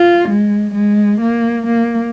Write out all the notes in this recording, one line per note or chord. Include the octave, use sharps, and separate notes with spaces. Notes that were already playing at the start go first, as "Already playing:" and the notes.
Already playing: F4
G#3
G#3
A#3
A#3